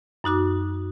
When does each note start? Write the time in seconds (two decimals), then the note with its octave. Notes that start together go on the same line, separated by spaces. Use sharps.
0.24 F#2 D#4 F#4 D6